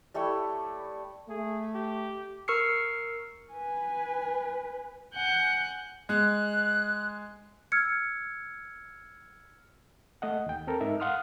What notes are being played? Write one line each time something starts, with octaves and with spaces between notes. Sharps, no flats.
G3 A3 E4 C#5
A3 G#4
G4
A#4 C#6 E6 F6 C7 C#7
B4 G#5
F#5 G#5 F#6 G6
G#3 F#6
E6 F6 G#6 C#7
A3 D#5 F#5
D#2 G5
C4 A4 A#4
G#2 D#4 A#4 E5
F5 F#5 C6 D#6 F6